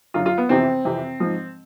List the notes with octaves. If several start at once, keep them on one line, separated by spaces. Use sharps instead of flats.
F#2 D3 F#3 F4
F4
B3
F2 C3 E3 C4
F2 C3 E3
G#2 F3